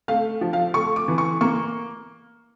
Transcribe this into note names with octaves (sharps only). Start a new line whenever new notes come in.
A3 F5
F3
F5
A3 C#6
D6
E3
C#6
A#3 C#6